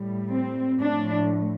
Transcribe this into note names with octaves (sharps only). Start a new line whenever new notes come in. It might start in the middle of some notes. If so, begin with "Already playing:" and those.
Already playing: A2 G3
C4
A2 F3 D4